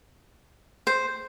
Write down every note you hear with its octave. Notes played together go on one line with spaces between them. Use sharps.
C5